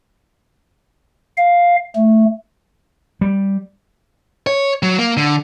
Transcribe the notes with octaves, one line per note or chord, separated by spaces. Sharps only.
F5
A3
G3
C#5
F#3
A#3
D3